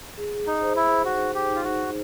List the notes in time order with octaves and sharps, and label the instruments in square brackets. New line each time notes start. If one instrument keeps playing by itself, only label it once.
[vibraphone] G#4
[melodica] D#4
[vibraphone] C5
[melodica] E4
[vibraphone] D#4 [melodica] F#4
[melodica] G4
[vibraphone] D#4
[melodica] F4
F#4